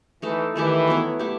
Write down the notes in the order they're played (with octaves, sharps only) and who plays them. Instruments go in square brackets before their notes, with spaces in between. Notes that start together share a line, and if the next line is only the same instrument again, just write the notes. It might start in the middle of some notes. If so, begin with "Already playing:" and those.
[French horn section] E3 [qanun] A3 D#4 A4
[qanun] D#3 A3 E4 G4 [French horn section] E3
[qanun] F#3 B3 E4
A3 E4 G4